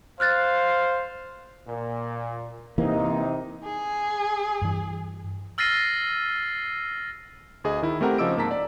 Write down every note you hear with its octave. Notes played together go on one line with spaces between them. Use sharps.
C5 F5 F6 F#6 A6
A#2
C3 E3 A#3 D#4
G#4
G2 E3
E6 F6 A6 A#6 C7 D#7
D2 G#4 D#5
D#3 E4
A3 C4 G4 A#4 F#5 A#5
C#3 F3 D#5 D6 E6 D7
G#2 A#3 A5 A#5 B6
D5